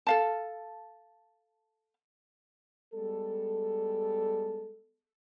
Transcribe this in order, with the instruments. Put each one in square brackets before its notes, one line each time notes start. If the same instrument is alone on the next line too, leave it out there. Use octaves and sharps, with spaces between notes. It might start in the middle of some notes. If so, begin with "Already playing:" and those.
[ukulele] A4 F5 A5
[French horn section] G3 G#3 B3 A4